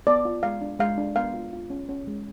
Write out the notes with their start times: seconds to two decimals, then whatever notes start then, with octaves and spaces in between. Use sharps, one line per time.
0.07 B3 D5
0.25 F4
0.43 G#3 F5
0.61 D4
0.79 G#3 F5
0.98 D4
1.16 B3 F5
1.34 F4
1.53 F4
1.70 C#4
1.89 C#4
2.07 G#3